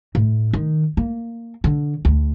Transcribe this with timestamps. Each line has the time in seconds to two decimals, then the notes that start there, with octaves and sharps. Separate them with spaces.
0.15 A2
0.53 D#3
0.97 A#3
1.64 D3
2.05 D2